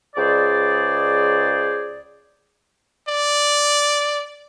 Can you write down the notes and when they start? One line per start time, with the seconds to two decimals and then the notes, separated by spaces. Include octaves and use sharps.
0.16 C#2 G#4 C5 D5
3.09 D5